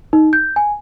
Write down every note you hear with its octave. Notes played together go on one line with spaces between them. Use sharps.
D#4
G6
G#5